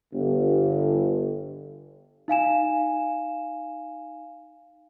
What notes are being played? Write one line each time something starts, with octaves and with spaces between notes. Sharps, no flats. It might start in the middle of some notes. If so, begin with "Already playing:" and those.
G1
D#4 F5 G#5 E7